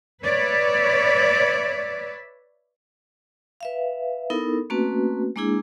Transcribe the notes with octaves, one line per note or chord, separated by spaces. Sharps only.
B4 C#5 D5 E5
B4 E5 F5
B3 D#4 E4 A4 A#4
A3 A#3 C4 C#4 F#4 B4
G#3 A#3 D4 E4 G#4